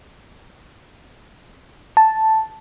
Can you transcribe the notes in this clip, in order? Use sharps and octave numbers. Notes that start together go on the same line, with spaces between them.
A5